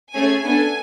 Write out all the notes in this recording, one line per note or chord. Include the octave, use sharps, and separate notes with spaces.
A3 C#4 G#4 G#5
B3 D4 A4 G#5